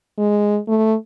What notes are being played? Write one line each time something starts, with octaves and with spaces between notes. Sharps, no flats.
G#3
A3